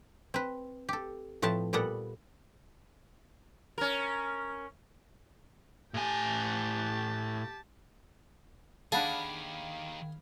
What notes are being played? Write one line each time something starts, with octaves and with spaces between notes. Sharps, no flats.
C4 B4
G4 A4
A2 F3 C4 B4 A5
A#2 G3 B3 A4 F#5
C#4 A#4
A2 G4 G#5 A5
D#3 D4 G4 G#4 F5 F#5 A5 B5